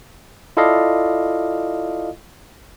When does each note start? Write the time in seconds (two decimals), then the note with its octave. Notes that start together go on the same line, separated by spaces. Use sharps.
0.57 E4 F4 A4 D5 D#5 F5